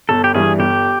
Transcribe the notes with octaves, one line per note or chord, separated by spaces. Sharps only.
G1 A4
G4
G2 E3 G3 G#4
G1 G4